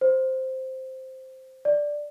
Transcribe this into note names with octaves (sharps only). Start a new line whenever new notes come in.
C5
D5